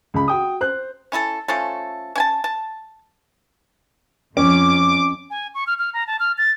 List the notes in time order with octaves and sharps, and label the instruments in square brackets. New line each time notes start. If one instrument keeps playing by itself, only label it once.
[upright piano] C#2 B5
F#4 G5 D#6
C5 F#6
[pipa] C#4 E4 G#4 A4
F3 A3 C#4 A4
C#4 G#5 A5
A5
[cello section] F2 [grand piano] C#4 [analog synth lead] D6
[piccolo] G#5
C#6
F6
F6
A#5
A5
F6
A6